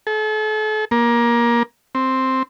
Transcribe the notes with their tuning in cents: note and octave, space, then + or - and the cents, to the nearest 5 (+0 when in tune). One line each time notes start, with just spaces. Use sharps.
A4 -40
A#3 +20
C4 +5